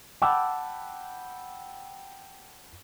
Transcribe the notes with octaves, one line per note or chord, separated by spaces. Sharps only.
F#5 G5 A5 B5 D6 E6